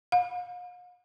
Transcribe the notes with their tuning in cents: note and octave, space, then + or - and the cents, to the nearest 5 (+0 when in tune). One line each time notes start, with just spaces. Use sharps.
F5 +45